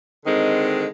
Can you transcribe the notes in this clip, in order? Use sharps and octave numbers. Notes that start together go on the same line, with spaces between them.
D3 D#3 G#3 C4 D#4